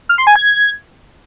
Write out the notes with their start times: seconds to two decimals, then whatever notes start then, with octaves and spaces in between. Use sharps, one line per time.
0.09 F6
0.18 C6
0.27 G#5
0.36 G#6